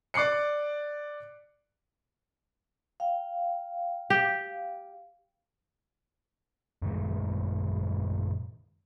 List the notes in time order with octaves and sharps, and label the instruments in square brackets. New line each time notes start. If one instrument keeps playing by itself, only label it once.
[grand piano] D5 D6 F#6 C7 C#7
[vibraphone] F5 G5
[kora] G4
[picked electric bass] F#2 A#2 D#3 G#3